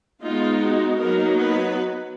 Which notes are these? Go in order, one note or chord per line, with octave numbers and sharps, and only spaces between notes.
G#3 B3 D#4 F4
F#4
F#3 A#3 B3 D#4 A#4
B3 B4